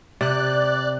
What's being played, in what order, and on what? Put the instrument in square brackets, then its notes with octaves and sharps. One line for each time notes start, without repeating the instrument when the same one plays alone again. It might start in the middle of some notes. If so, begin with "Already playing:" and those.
[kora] C3 [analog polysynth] D5 F#6